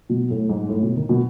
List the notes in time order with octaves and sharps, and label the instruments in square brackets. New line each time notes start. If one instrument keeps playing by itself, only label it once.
[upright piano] B2
A2
G#2
A2
B2
D#3
B2